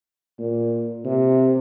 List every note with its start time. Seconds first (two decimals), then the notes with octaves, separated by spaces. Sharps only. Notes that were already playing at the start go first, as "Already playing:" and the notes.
0.39 A#2
1.05 C3